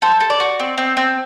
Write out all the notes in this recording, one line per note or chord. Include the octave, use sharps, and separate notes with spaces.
A4 C5
A4
D5
F#4
C4
C4
C4